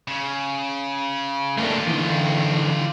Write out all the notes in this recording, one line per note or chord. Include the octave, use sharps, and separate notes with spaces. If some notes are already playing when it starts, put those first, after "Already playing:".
C#3
A3 A#3 D4 F4 G4
D3 E3